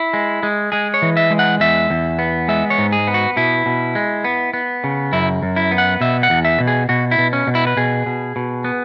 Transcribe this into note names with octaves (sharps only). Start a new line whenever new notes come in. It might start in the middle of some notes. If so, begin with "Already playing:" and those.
Already playing: E4
G#3
G#3
G#3 G#4
C#5
E3
E5
G#3
F#5
E2 E5
E2
B3
G#3 E5
C#5
G#2
G#4
B3
F#4
B2 E4
B2
G#3
B3
B3
C#3
F#2 E4
F#2
E4
B3
F#5
B2 E5
F#5
E2
E5
B2
G#4
B2 F#4
E4
B2
C#4
B2
E4
B4
B2 G#4
B2
B2
B3